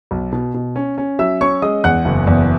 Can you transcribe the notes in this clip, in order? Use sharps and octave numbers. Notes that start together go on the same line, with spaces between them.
B1
B2
B2
C#4
C#4
F#3 E5 E6
C#4 C#5 C#6
G#3 D#5 D#6
E2 F#5 F#6
F#1
E2